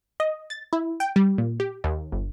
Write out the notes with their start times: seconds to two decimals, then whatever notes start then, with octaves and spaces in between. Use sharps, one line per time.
0.20 D#5
0.50 A6
0.73 E4
1.00 G5
1.16 G3
1.38 A#2
1.60 G4
1.84 D#2
2.12 G1